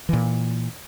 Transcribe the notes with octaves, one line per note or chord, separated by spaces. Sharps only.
A#2 E3